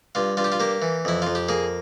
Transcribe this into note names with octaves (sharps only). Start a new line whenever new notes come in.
G2 F4
G2 F4
G4
F4
A#3 G4
E3
F2 E4
F2 F4
G4
A#3 G#4